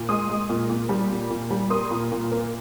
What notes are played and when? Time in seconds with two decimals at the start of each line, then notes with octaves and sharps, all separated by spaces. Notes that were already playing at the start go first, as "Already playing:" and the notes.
Already playing: A#2
0.09 G#3 C6 D#6
0.29 G#3
0.49 A#2
0.70 A#2
0.89 G3
1.10 A#2
1.30 A#2
1.50 G3
1.70 A#3 C6 D#6
1.91 A#2
2.12 A#2
2.32 A#3